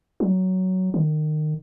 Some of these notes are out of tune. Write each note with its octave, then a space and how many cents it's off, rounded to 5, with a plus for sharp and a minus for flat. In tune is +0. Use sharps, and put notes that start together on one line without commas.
F#3 +10
D#3 -25